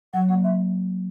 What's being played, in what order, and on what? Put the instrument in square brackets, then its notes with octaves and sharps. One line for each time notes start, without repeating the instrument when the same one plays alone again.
[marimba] F#3 [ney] F#5
[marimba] A#3 [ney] F#5
[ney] E5